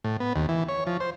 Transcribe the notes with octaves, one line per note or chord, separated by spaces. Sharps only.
A2
B3
D#2
E3
C#5
F3
C5